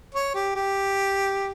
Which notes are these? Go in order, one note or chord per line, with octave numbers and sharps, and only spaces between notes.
C#5
G4
G4